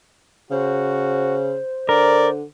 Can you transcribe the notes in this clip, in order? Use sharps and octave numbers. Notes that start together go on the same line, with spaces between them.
C#3 F#4 C5
D3 A#4 D5